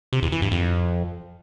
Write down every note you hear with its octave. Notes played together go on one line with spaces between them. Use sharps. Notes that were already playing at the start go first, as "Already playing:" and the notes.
C3
E2
E3
G2
F2